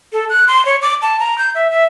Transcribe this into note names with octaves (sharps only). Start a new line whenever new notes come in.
A4
F#6
C6
C#5
D6
A5
A#5
G6
E5
E5